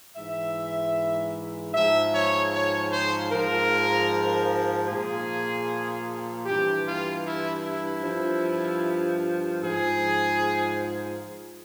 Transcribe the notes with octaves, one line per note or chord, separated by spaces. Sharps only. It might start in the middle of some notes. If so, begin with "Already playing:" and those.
G#2 E3 E5
G#2 F3 E5
C#5
C#5
C5
G#2 F3 A#4
A#2 F3 G#4
G2 E3 G4
F4
E4
E4
G2 F3
G#2 F3 G#4